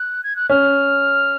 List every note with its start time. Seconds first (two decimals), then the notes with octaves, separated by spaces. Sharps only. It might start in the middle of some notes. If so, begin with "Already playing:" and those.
Already playing: F#6
0.24 G#6
0.36 F#6
0.50 C#4 F6